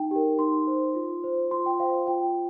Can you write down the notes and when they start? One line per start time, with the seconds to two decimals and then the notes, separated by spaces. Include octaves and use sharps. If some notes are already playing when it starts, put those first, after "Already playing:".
Already playing: D#4 G5
0.11 G4 A#4
0.39 D#4 C6
0.67 C5
0.95 F4
1.24 C5
1.51 F4 C6
1.66 G5
1.80 C5 F5
2.07 F4 G5